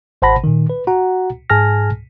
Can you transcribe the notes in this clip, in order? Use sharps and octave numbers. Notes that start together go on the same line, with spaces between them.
G#1 C5 F#5 A5 B5 A#6
A#2 D#3
B4
F#4 F#5 A#5
G#2 G#4 G#5 A5 F6 A#6